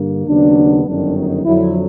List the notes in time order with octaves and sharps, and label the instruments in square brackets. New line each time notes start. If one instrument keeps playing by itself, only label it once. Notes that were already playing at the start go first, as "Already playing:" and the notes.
Already playing: [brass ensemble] G2 D3 A#3
D#2 C#3 F#3 B3 D4
G1 F#2 D#3 F#3 D4
D#4
F2 D3 F#3 E4